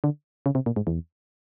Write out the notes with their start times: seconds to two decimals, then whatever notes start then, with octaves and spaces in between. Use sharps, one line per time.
0.04 D3
0.46 C#3
0.55 C3
0.66 A#2
0.76 G#2
0.87 E2